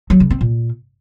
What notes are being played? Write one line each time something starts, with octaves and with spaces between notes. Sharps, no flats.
F#3
C#3
C4
A#2